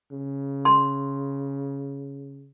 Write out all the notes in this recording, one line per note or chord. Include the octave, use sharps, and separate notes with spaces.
C#3
C6